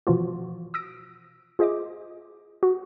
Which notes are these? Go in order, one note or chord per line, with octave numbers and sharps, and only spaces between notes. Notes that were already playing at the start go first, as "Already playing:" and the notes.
B2 E3 F3 F4 F#4
D#6 E6 A#6 D7
F4 G#4 C5 D#5 E5 D6
F#4